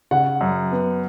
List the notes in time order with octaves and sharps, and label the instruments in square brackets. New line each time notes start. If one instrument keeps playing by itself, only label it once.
[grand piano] C#3 [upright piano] F#5
[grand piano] F#2
B3